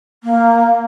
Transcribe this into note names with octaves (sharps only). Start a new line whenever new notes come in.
A#3